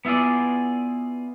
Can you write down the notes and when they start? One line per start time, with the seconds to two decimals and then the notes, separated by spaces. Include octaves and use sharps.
0.05 B3 E4 F4 G#4 D5